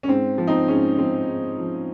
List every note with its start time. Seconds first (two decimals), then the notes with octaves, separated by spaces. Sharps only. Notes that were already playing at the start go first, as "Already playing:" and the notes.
0.03 C#4
0.08 G#2 C4
0.38 F3
0.47 C4 D#4
0.68 G#2 C#4
0.98 F3 C4
1.27 G#2
1.58 F3